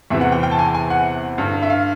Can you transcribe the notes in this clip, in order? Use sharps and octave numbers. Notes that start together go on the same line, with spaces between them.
E2 C3 E3 E5
F#5
G5
G5
A5
G#5
G#5
F#5
G2 D3
E5
F5